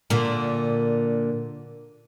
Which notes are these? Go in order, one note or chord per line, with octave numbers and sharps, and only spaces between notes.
A#2 D3